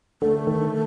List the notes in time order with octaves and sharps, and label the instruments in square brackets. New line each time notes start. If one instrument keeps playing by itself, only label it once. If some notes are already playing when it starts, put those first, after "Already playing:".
[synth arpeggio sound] D3 [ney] A3
[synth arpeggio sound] D#3